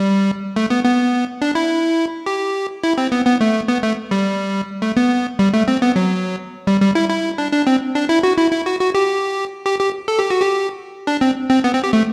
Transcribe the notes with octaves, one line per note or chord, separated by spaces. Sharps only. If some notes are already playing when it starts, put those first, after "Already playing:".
Already playing: G3
A3
B3
B3
D4
E4
G4
E4
C4
B3
B3
A3
B3
A3
G3
A3
B3
G3
A3
C4
B3
F#3
G3
G3
E4
E4
D4
D4
C4
D4
E4
F#4
E4
E4
F#4
F#4
G4
G4
G4
A4
G4
F#4
G4
D4
C4
C4
B3
C4
G4
A3